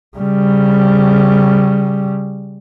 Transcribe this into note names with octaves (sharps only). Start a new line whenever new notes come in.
C#3 G3